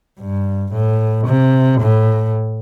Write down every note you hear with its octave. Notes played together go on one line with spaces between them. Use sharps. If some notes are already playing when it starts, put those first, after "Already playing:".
G2
A2
C3
A2